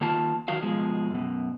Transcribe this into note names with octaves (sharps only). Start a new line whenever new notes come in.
D#3 A#3 F4 A5
D#3 F#3 F#4 F5
B2 F3 G#3
F#2 B2